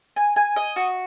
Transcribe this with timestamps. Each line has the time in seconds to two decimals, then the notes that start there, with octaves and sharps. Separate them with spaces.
0.16 G#5
0.36 G#5
0.56 D#5
0.76 F#4